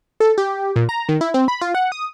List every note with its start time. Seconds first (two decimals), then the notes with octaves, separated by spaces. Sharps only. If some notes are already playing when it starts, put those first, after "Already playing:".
0.20 A4
0.38 G4
0.76 A#2
0.89 A#5
1.09 D#3
1.21 E4
1.34 C4
1.48 B5
1.61 F4
1.75 F#5
1.92 D#6